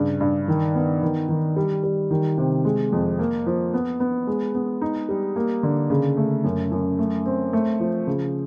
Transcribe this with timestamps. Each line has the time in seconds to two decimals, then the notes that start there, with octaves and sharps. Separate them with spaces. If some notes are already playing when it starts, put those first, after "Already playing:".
Already playing: G2 C#3
0.21 G2
0.48 D#3
0.75 B3
1.02 D#3
1.29 D#3
1.56 G3
1.83 G3
2.11 D#3
2.38 C3
2.65 G#3
2.92 F2
3.19 A#3
3.46 F3
3.73 B3
4.00 B3
4.27 G#3
4.55 B3
4.81 D#4
5.09 G3
5.36 A#3
5.63 D3
5.90 C#3
6.17 A3
6.44 F#2
6.72 F#2
6.99 A3
7.26 C4
7.53 A3
7.80 F3
8.07 C#3